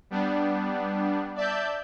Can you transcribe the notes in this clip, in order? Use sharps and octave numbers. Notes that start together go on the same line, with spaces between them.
G3 B3 D4
D5 E5 A5 G6